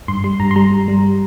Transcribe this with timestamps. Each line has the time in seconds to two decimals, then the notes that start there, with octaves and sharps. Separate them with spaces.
0.08 G2 C6
0.24 G3 C6
0.40 G2 A#5
0.51 C6
0.56 G3 A#5
0.71 G2
0.88 G3